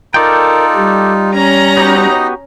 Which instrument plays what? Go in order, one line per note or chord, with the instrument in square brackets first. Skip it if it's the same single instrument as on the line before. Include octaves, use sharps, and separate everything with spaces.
[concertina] D#4 F4 [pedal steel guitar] A4 D5 G5 [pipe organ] A#4
[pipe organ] G3
[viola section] C#4 A#5
[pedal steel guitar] B3 F#4 G4 [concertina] D#4 D#5